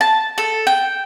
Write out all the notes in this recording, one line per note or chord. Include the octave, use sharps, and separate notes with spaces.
A5
A4
G5